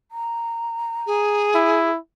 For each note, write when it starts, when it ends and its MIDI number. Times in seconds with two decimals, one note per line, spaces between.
0.12 1.46 82
1.07 1.90 68
1.55 1.97 64